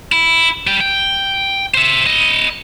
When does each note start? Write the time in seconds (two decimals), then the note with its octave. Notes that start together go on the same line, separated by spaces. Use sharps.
0.12 E4
0.67 G3 G5
0.81 G5
1.74 C5 E5
2.06 E4 D#5